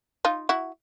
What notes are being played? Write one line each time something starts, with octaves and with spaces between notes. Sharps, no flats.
D#4 F4
E4 F#4